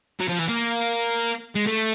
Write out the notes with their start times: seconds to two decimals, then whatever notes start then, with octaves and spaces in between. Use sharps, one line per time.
0.20 F#3
0.28 F3
0.39 E3
0.49 A#3
1.55 G#3
1.67 A3